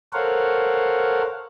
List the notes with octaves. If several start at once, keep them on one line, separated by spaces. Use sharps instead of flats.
A4 A#4 C5 C#5 F5 F#5